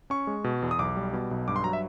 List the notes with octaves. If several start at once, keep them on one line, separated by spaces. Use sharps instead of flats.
C#4 C#6
G#3
B2
E2
D#6
B1 D6
G3
B2
B1
G2 D6
C6
F#3 A#5
E5